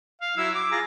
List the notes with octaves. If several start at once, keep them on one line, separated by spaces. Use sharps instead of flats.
F5
F#3 E4 E6
D6
F4 G#4 A#5